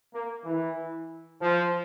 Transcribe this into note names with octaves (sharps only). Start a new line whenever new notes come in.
A#3
E3
F3